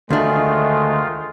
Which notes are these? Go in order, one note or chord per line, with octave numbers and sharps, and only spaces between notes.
D2 D#3 G#3 A3 D4 F4